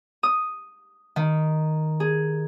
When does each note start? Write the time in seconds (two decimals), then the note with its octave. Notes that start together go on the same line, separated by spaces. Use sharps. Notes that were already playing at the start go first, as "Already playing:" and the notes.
0.23 D#6
1.16 D#3
2.00 G#4